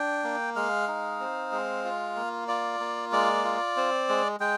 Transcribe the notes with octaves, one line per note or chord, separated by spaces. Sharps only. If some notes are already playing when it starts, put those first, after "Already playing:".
Already playing: D4 G5
A#3
G#3 F5
D#4
C4
G#3
F4
A#3
F4 D5
A#3
G#3 D5
F4
C4
G#3
G#3 G5